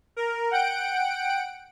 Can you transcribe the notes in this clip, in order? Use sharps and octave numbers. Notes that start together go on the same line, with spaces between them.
A#4
F#5 G5 D7